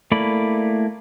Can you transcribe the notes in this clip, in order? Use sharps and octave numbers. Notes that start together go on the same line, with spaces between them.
A3 A#3 E4 D5 B5